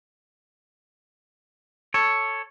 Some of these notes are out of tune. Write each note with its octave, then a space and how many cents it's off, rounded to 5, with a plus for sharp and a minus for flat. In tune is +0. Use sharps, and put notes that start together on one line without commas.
A4 +0 C#5 +0